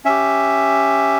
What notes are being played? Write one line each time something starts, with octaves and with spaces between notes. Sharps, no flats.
C#4 G4 E5